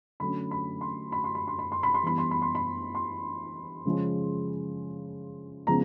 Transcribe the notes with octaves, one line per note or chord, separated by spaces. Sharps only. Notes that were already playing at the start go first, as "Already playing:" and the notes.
D3 F#3 A3 C#4 B5
B5
C6
B5
C6
B5
C6
B5
C6
B5
C6
E3 G3 B3 B5
C6
B5
C6
B5
C6
C#3 F3 G#3 C#4
C#3 F3 G#3 B3 A#5